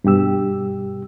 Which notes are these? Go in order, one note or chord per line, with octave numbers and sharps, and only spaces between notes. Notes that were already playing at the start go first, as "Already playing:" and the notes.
G2 B2 G4 E6